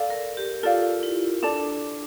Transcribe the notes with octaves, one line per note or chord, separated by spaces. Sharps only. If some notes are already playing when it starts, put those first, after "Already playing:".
Already playing: A4 D5 F5
A#4
G4
F4 A4 D5 F5
E4
D4 A4 D5 A5